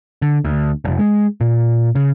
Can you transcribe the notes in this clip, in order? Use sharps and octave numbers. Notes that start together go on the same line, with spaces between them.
D3
D2
F1
G#3
A#2
C#3